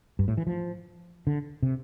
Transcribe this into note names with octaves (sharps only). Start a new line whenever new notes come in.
G2
A2
E3
F3
D3
C3